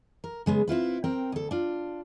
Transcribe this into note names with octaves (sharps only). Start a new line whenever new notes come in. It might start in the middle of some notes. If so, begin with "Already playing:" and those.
A#4
C#3 G#3 B3
C4 E4 F4 B4
C4 A#4 G5
D2 A4
D4 F4